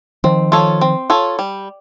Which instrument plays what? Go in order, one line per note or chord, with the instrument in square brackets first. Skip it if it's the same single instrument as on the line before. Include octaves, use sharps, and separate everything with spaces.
[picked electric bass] D#3 F3 [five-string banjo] C4
[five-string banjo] F4 A4 C#5
C4
F4 A4 C#5
G3